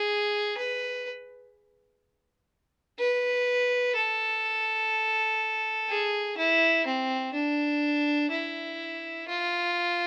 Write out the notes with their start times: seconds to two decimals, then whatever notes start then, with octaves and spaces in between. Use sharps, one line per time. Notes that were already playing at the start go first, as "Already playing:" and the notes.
Already playing: G#4
0.57 B4
2.99 B4
3.96 A4
5.89 G#4
6.37 E4
6.86 C4
7.33 D4
8.31 E4
9.28 F4